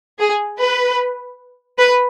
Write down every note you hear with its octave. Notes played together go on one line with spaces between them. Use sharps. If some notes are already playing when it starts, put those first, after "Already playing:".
G#4
B4
B4